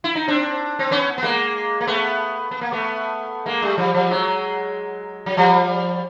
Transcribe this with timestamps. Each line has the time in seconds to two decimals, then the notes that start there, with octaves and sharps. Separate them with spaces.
0.04 E4
0.16 D#4
0.28 C4 D4
0.79 C4
0.91 B3 C#4
1.18 B3
1.23 G#3 A#3
1.81 A#3
1.87 A3 B3
2.51 B3
2.61 A#3
2.72 A3 B3
3.46 G#3 A#3
3.62 G3 A3
3.78 F3 G3
3.94 F3 G3
4.10 F#3 G#3
5.26 F#3
5.37 F3 G3